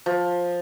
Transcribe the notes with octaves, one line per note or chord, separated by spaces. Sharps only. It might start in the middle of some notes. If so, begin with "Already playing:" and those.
F3